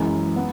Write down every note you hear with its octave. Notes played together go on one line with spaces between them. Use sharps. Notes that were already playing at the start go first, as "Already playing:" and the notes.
Already playing: F#2 E3 G#3
B3